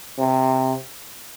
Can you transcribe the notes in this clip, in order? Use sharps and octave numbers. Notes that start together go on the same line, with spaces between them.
C3